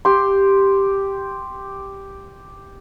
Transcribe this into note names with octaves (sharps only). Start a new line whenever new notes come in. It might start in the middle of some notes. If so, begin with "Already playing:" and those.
G4 C6